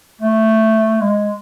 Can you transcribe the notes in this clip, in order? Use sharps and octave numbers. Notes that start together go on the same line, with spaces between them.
A3
G#3